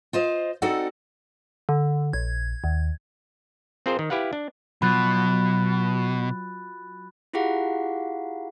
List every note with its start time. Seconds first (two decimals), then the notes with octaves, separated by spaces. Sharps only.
0.13 F4 C5 D#5
0.62 C4 D#4 F#4 A4 D5 F#5
1.69 D3
2.13 A#1 G#6
2.64 D#2
3.86 C4 F4 G#4 A#4 C5
3.99 D#3
4.10 E4 G4 B4 F5 F#5
4.33 D4
4.82 B2 F#3 F4 B5 F#6 A6
7.33 E4 F4 G4 G#4 F5 F#5